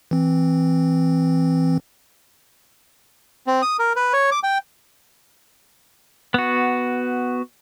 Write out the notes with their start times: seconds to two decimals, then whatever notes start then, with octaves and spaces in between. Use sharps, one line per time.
0.11 E3 C4
3.47 C4
3.62 D#6
3.79 A#4
3.96 B4
4.13 C#5
4.32 D6
4.43 G5
6.34 B3 F#4